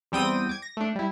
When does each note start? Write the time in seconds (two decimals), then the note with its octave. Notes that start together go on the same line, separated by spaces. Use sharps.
0.12 E2 G3 C4 G5 D#6 D#7
0.49 D6 G#6
0.62 A#6
0.77 A3 D4
0.95 G3 E4